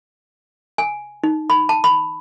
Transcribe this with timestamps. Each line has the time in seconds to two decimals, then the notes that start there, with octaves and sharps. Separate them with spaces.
0.78 G#5
1.24 D#4
1.50 B5
1.69 A5
1.84 B5